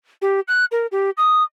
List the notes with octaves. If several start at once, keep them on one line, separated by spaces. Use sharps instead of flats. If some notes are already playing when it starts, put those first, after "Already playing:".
G4
F#6
A#4
G4
D#6